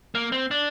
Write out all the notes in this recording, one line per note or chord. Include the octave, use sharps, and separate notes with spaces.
A#3
C4
D4